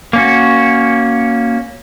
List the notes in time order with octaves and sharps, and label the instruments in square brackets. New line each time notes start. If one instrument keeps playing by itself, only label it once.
[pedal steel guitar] A#3 C#4 F#4